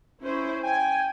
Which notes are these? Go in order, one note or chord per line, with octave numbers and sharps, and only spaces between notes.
C#4 E4 C5
G5 G#5